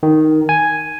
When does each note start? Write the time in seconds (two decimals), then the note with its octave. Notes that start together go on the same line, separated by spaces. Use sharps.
0.03 D#3
0.49 G#5